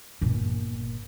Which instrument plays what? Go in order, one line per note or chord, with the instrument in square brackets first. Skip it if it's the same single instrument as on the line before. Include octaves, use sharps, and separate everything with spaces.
[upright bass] G1 A#2